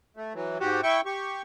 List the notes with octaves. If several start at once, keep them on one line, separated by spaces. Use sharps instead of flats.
A3
E3 F#3
G#2 F#4 G4
E4 G5 C#6
G4 C#6